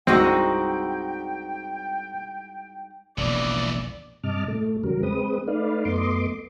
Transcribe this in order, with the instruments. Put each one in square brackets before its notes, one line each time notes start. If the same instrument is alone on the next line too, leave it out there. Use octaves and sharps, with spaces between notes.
[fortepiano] C2 G2 E6 [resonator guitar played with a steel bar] G#3 D#4 F#4 [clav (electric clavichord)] C4 [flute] G5
[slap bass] E1 A#1 [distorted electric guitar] C#3 E3 [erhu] D5
[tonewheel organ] G2 C3 D#5 A5 D6 F6
A2 A3
E2 C#3 F#3 G3 A#4
G#3 C4 B4 D#6
A3 D#4 B4 D5 F5
F#2 A3 B3 D#5 C6 D6